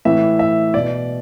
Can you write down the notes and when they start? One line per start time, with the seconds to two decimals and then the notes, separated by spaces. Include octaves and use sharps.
0.05 A2 E3 E5
0.39 E5
0.74 B2 D5